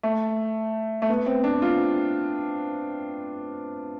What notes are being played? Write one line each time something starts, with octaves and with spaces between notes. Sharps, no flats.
A3
A3
B3
C4
D4
F4